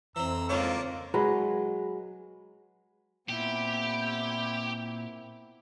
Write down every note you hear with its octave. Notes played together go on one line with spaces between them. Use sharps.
F2 E3 C4 A#5 E6
C#2 G#2 A#3 C#4 D4 F4
F#3 G#3 B4
A#2 B3 C4 E4 G4